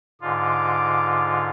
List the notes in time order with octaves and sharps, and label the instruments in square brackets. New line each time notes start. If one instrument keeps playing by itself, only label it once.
[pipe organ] G#2 D3 F4 [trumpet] D6